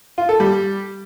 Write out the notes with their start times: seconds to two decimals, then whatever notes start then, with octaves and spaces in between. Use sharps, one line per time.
0.18 F4
0.29 A4
0.40 G3